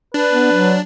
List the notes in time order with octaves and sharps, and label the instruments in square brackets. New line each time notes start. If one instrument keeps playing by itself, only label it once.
[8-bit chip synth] D4 [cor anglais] B4
[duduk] B3
F#3